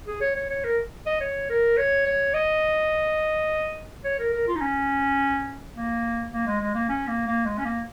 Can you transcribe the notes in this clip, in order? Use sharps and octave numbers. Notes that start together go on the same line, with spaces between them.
G#4
C#5
C#5
C#5
A#4
D#5
C#5
A#4
C#5
C#5
D#5
C#5
A#4
A#4
F4
D#4
C#4
A#3
A#3
G#3
G#3
A#3
C#4
A#3
A#3
G#3
C#4
A#3